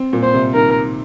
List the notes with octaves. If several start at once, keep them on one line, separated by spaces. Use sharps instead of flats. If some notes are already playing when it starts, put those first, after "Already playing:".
Already playing: C4
A#2
C5
C3
D#3 A#4